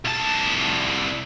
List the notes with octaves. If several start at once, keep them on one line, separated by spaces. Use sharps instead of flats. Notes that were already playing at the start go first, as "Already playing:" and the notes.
C2 A5